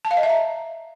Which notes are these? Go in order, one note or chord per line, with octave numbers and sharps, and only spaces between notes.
A5
F5
D#5
E5
A#5